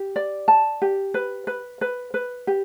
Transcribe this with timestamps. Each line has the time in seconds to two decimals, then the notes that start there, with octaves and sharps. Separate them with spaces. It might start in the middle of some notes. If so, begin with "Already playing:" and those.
Already playing: G4
0.16 D5
0.48 A5
0.82 G4
1.14 B4
1.47 B4
1.81 B4
2.14 B4
2.47 G4